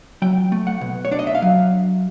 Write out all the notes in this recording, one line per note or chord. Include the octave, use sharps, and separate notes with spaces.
F#3 G5
A3
F#5
B2
C#5
D4 D5
D#5
E5
F5
F#3